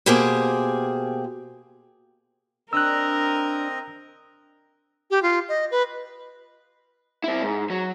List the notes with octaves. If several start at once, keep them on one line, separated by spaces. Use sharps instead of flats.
B2 A#3 G4 G#4 C5 G#5
C4 D4 A#4 D#5 A#5 E6 F#6
G4
F4
D#5
B4
C4 E4
G#2
F#3